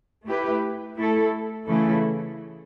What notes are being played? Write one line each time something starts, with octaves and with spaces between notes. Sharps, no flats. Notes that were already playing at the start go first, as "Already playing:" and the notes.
A3 E4 G4 B4
A3 E4 A4
C#3 E3 A3 E4 A4